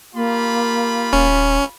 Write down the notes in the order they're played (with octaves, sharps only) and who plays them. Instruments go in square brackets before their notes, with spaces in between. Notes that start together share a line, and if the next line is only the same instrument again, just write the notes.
[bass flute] A#3 [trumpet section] F4 G4 B5
[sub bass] D#1 [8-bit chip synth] C#4